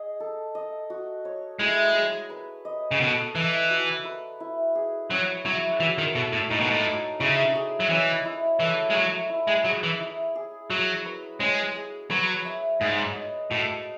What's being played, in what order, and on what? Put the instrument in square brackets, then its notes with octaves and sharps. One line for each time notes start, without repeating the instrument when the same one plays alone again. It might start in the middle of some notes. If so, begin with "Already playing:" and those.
Already playing: [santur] G#4 D#5
A4
D#5
F#4
C#5
[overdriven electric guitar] G#3 [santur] E4
[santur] G#4
B4
D#5
[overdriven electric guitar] C#3
[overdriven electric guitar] B2 [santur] A4
[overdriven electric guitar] E3 [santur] E5
[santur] F#4
B4
E4
G#4
[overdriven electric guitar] F#3 [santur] C#4
[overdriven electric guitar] F#3 [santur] E4
[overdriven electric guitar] E3 [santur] F#4
[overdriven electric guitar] D#3
[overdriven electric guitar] B2 [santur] A4
[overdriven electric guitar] A2
[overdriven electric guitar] A2 [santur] D#4
[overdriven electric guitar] B2
A2
[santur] F#4
[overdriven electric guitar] C#3 [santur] E4
[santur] G#4
[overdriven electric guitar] F#3
[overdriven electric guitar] E3 [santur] C#4
[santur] E4
[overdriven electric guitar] E3 [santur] A3
[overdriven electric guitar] G#3
[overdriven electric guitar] F#3 [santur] E4
[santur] E4
[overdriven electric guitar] G#3
[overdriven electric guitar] F#3 [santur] G#4
[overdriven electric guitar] E3
[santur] E4
G#4
[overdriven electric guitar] F#3 [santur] F#4
[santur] B4
[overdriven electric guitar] G#3 [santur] C#4
[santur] G#4
[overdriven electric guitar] F#3 [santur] B4
[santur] E5
[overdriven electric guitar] G#2 [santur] G#4
[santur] D#5
[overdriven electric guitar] A2 [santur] F#4